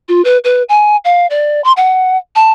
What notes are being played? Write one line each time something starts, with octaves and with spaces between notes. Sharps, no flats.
F4
B4
B4
G#5
F5
D5
C6
F#5
A5